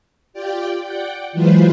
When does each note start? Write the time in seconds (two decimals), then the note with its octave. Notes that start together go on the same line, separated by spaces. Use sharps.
0.33 F4 G4 D5 G5
0.83 D5 F#5 G5
1.33 E3 F#3 G#3 F4 B4 C5